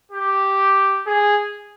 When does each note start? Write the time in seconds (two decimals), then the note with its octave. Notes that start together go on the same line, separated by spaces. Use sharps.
0.12 G4
1.07 G#4